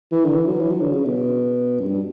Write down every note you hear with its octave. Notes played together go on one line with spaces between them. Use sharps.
E3
D3
E3
F#3
E3
F#3
D3
C#3
B2
F#2
G2